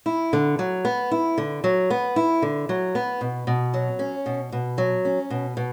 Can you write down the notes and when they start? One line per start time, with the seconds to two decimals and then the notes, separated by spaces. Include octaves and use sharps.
0.06 E4
0.33 D3
0.59 F#3
0.85 B3
1.11 E4
1.38 D3
1.64 F#3
1.90 B3
2.16 E4
2.42 D3
2.69 F#3
2.95 B3
3.21 B2
3.47 B2
3.74 F#3
3.99 C#4
4.26 B2
4.52 B2
4.78 F#3
5.05 C#4
5.30 B2
5.57 B2